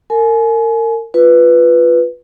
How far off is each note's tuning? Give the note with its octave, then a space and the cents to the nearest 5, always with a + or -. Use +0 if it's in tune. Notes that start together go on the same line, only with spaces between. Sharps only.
A#4 -35 G#5 +30
F4 +0 B4 +0